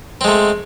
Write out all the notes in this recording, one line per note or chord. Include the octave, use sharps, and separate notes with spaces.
G#3 A3 C4